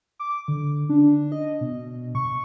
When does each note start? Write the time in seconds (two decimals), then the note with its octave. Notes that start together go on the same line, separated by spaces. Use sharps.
0.19 D6
0.48 D3
0.89 D4
1.32 D#5
1.61 B2
2.15 C#6